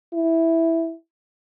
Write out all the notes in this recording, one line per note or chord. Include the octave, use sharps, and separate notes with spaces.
E4